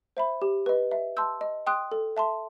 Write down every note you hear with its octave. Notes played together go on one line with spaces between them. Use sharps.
C5 E5 B5
G4
B4 D#5
E5
A5 C6 E6 G6
D#5
G5 C6 D#6 F#6
A4
E5 A5 C6